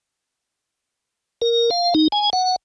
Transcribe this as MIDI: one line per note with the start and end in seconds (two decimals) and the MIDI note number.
1.42 1.70 70
1.71 1.94 77
1.95 2.08 63
2.12 2.30 80
2.33 2.56 78